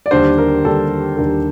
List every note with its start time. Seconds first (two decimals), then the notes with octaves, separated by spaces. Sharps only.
0.06 D5
0.11 D#2 D3 G3 D4 C5
0.38 A#4
0.64 D#2 D3 G3 D4 A4
1.17 D#2 D3 G3 D4 A#4